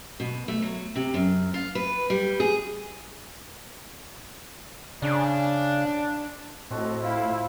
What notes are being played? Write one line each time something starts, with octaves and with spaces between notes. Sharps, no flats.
B2
A3
F#3
C3
F#2
F4
B4
G3
G#4
C#3 D4
A2 C4 F#4 A4 D#5
E4 F4 F5 G5